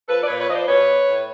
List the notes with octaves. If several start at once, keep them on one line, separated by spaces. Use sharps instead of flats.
F3 A4 B4
D5
A#2 B4 C#5
B4 C#5
F3 D#5
C5 D5
B2 B4 C#5
A2